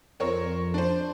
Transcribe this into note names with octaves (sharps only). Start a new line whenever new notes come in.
F2 C4 A#4 C#5
D4 C5